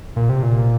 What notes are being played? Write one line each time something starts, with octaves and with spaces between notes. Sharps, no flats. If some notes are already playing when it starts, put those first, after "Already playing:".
A#2
C3
A#2